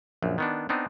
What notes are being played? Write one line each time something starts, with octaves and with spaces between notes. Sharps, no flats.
A#1 F#2
D#3 B3 D4
B3 C4 D4 D#4